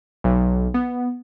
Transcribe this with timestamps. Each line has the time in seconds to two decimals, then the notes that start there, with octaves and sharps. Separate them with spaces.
0.24 B1
0.74 B3